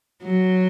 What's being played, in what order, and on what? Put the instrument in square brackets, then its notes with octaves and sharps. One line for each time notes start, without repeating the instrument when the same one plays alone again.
[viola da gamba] F#3